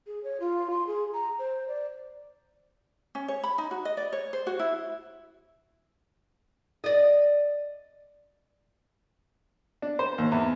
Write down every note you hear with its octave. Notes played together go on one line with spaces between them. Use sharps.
G#4
C#5
F4
C6
G#4
A#5
C5
D5
C#4
C#5
B5
D#4
F#4
D#5
D5
C#5
C5
F#4
E4
D5 D#5
D4
C5
D#2
E2